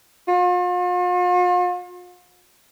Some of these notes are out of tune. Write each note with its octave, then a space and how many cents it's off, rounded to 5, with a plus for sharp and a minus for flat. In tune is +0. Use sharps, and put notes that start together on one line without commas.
F4 +45